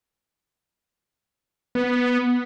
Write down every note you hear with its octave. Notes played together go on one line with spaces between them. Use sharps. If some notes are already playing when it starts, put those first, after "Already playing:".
B3